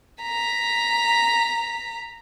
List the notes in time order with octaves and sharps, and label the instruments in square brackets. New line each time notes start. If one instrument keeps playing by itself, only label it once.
[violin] A#5 B6